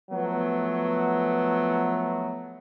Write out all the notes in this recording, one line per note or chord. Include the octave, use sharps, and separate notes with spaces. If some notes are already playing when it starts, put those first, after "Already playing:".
F3 F#3 A3 B3